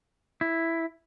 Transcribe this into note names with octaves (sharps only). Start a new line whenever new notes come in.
E4